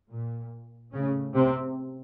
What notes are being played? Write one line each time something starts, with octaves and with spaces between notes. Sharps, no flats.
A#2
A2 C#3 C#4
C3 C4